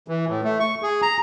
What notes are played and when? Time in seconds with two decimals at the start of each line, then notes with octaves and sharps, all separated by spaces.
0.08 E3
0.28 A2
0.44 A3
0.60 C#6
0.83 G#4
1.02 A#5